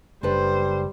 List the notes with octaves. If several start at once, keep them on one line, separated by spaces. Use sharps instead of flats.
F#1 G3 D4 A4 B4 C5